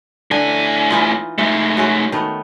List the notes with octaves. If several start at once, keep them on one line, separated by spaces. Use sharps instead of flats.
A2 D3 G#5
E3 D#4 F4
G#3 A3 D#4
G#3 C#4 F#4
D#3 A3 B3